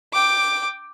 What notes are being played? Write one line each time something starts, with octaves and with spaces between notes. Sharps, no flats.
G5 D6